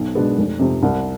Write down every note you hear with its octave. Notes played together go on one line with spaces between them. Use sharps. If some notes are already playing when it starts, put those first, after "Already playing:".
Already playing: B1
B2 G#3 B3 D4
F1
F2 C3
C2